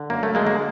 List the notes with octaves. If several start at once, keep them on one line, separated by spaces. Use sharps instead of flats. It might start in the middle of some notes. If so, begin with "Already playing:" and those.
Already playing: D3
F#2 A#3
A3
D3 G#3 A#3
A#3